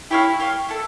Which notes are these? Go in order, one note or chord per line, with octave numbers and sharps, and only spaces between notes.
E4 G4 C#5 F5
G4 C#5 F5
E4 A4